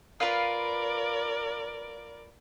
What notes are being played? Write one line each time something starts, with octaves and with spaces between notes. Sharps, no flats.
F4 A#4 B4 D5 F5